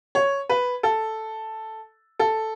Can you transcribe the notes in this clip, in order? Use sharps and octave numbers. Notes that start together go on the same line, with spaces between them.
C#5
B4
A4
A4